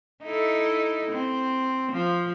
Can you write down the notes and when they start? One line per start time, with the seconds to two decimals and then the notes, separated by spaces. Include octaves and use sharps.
0.24 D#4 E4 A4
1.12 C4
1.92 F3